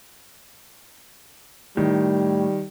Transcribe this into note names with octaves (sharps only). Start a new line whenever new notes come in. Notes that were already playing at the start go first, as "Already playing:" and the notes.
A2 D#3 G3